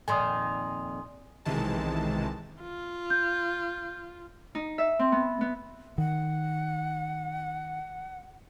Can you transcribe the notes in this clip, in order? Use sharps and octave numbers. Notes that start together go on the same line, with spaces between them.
F2 A#2 D#3 G#5 C6 D#6
B1 C3 D#3 E3 G#3 A5
F4
G6
D#4
E5
C4
B3
B3
D#3 F#5